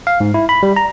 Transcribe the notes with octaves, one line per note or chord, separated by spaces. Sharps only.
F5
G#2
E4
B5
G3
A#5